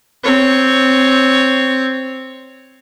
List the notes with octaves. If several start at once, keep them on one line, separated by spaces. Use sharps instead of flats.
C4 C#5